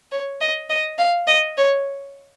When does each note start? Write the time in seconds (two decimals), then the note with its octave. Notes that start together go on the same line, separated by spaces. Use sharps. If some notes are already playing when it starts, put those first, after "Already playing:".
0.12 C#5
0.41 D#5
0.70 D#5
0.98 F5
1.27 D#5
1.57 C#5